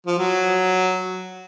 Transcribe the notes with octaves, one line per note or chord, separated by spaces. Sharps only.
F3
F#3